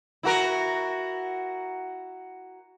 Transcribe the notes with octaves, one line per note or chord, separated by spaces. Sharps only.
E4 F#4 A#4